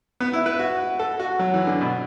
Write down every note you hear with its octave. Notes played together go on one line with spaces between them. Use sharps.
B3
E4
B4
F#4
A4
F#4
F#3
E3
D3
B2